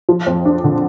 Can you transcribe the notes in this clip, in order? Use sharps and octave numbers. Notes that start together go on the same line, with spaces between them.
F3
F2
D4
D3